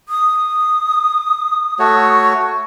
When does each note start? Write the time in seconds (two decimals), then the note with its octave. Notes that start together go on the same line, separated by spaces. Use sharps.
0.09 D#6
1.79 A3 F#4 C#5